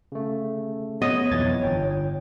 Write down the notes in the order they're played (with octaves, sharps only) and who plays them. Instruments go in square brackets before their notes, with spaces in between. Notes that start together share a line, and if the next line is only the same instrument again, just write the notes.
[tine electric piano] C#3 A3
[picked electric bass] B3 [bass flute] C#5 [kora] D#5
[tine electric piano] B1 G#6 A6 [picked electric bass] F2 E3 B3
[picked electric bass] G1 [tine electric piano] G5